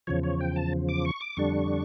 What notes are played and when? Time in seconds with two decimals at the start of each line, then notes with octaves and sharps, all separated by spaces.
0.07 E2 C#3 F3 C#5
0.23 C#5
0.40 G5
0.56 A5
0.89 D6
1.05 C#6
1.21 D6
1.37 F2 D3 G3 D4 C#6